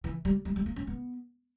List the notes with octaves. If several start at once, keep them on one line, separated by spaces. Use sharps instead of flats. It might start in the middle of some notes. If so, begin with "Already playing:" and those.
E3
G3
G3
G3
A#3
C#4
B3